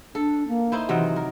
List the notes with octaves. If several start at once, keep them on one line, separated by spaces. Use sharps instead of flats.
D4 A4
A#3
D#4 E4 C5
C3 D#3 E3 F#3
A#4